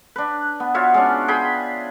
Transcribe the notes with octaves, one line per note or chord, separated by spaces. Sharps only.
D4 B4
B3
F4 F#4 C#5 E5
G#3 C#4 D4
G#4 G5 B5